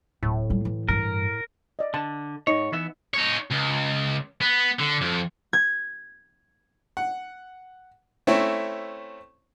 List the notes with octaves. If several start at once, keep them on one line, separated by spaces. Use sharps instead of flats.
D1 A2
G3 F4
E3
G2 E3 A#4
D5 D#5
D3 A5
G#2 D#4 C#5 D#5
E3 B3 E5
D#4 C#5
C#2
B3
D3
F2
G#6
F#5
A3 C4 C#4 E4